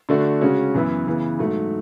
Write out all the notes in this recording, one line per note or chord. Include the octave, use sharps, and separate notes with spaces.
D3 A3 D4 F#4
C#3 G#3 C#4 F#4
F#2 E3 B3 E4
C#3 E3 B3
G#2 F#3 A3